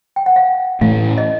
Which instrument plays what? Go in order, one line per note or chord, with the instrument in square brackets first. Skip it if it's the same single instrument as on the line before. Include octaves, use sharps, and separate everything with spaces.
[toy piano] G5
F#5
F5
[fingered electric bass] A2 E3 A3 [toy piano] F5
[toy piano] D#5